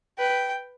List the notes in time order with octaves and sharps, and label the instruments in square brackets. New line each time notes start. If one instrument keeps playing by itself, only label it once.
[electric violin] B4 [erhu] G5